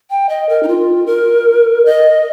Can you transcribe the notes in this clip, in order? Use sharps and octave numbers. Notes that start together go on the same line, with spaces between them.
G5
D#5
A#4
D#4
F4
A#4
D#5